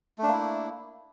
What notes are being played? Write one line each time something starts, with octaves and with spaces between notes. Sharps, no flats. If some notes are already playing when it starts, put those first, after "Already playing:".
A3 A#3 D4 E4